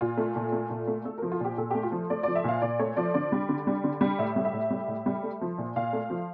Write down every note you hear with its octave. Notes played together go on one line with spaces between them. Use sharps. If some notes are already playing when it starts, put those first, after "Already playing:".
A#2 F4
A3
A#2
A3
A#2
A3
A3 A4
F3 A#4
F4
A#2 G4
A#2 A4
A3 G4
F4
F3
A3 D5
F3 D5
E5
A#2 F5
A#2 D5
A3 C#5
F3 D5
D3 D5
G3
D3
G3
D3
G3
A2 E5
G3
E5
A2
G3
A2
G3
A3
F3
A#2
A#2 F5
A3
F3